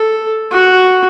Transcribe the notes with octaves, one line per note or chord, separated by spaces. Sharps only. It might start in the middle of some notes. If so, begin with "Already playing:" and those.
Already playing: A4
F#4